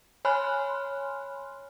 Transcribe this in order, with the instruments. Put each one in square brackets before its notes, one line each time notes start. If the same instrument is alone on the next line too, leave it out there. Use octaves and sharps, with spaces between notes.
[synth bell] C#5 G#5 B5 C6 F6 F#6